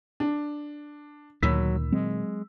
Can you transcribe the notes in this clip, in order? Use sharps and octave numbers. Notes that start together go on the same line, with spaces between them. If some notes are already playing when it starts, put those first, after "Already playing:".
D4
D2 A#2 D#3 F#3 B5 E6 B6
F#3 G#3 C4